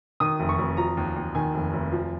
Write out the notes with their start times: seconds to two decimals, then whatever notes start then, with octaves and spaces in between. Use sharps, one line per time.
0.20 D#3 D#6
0.39 F1
0.49 C#6
0.58 F1
0.77 F3 A#5
0.97 D#2
1.16 D#2
1.35 D#3 G#5
1.54 F1
1.73 F1
1.92 F3